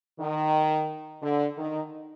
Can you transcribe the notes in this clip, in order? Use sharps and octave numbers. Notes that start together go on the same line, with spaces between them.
D#3
D3
D#3